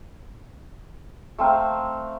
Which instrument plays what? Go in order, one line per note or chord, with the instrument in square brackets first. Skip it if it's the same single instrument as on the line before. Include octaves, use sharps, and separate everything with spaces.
[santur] A3 C4 F5 A#5